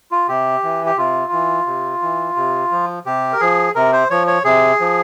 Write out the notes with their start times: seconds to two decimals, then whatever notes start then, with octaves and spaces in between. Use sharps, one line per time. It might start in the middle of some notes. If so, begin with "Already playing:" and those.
0.12 F4
0.28 C3 G4
0.63 E3
0.86 G4
0.97 C3 F4
1.32 E3
1.67 C3
2.02 E3
2.36 C3
2.71 F3
3.06 C3 G4
3.33 A#4
3.40 F3 G#4
3.75 C3 A#4
3.93 C5
4.10 F3 C#5
4.27 C#5
4.45 C3 G#4
4.80 F3